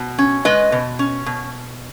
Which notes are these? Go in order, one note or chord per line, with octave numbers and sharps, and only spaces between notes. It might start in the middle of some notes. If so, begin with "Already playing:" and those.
Already playing: B2
C#4
G#3 B4 D#5
B2
C#4
B2